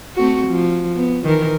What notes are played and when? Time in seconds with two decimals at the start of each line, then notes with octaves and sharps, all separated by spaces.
0.16 A3 C4 F#4
0.47 F3
0.95 B3
1.24 D#3 E3 A#4